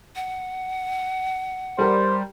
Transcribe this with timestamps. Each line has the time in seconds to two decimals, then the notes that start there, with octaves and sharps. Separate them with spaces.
0.16 F#5
1.78 G3 G4 A#4 C5